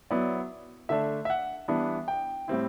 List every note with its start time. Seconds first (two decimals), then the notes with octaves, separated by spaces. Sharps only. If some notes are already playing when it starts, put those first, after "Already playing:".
0.10 F#3 B3 E4 D5
0.89 D3 A3 D4 E5
1.25 E5
1.30 F#5
1.68 E3 G3 B3 D4
2.08 G5
2.48 A2 G3 C4 E4